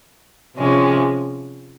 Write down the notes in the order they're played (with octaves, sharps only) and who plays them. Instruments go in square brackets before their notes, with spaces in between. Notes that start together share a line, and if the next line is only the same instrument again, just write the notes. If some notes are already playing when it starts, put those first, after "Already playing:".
[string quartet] C3 F3 G#3 C#4